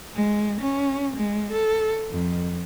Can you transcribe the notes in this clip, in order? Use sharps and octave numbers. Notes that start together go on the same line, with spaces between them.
G#3
C#4
G#3
A4
F2